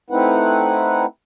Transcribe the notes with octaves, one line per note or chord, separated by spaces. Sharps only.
A3 C4 D#4 E4 B4 F#5